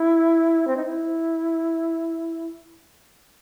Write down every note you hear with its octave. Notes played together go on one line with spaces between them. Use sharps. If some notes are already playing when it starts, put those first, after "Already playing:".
Already playing: E4
C4
D#4
E4